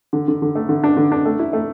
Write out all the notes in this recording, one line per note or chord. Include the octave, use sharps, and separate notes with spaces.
D3
D3
D3
A3
D3
D4
D3
D4
A3
E4
A3